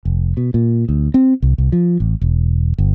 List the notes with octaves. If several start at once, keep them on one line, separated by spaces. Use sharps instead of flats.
F1
B2
A#2
D2
C4
C2
C2
F3
A1
E1
G1